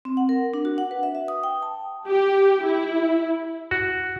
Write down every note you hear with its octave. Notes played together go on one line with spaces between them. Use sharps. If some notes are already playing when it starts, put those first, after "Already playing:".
C4
F#5
A#4
D4
F#4
F#5
B4
E5
E5
D#6
G5
A5
G4
E4
F#4